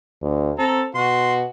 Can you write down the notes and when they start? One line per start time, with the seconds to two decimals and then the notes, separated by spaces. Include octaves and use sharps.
0.22 D2
0.58 C4 A4 A#5
0.95 B2 F#4 C6